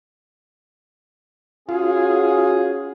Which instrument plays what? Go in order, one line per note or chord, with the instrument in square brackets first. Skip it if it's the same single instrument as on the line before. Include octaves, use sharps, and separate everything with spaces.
[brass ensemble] C#4 F#4 G#4 [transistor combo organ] F4